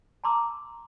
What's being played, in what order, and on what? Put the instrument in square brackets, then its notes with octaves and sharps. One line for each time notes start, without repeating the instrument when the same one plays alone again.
[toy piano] A5 A#5 C6 D6 E6